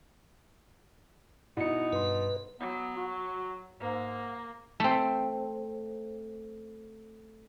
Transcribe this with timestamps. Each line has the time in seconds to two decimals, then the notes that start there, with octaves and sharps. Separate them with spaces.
1.57 B2 D#4 E4 C#7
1.93 G2 B4 C6
2.60 F#3 B3
2.97 F#4
3.80 G#2 A#3
4.80 A3 C4